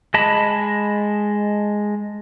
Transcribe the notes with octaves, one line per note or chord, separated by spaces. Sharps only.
G#3 D#5 A5 B5